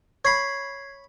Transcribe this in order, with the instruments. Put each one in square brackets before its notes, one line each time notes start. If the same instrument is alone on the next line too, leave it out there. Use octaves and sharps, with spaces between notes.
[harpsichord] C#5 B5 [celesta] G#6 C7